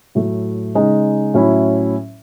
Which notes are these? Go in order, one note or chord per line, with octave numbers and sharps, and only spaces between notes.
A2 F#3 A3
C#3 G#3 D#4
A2 F#3 C#4 E4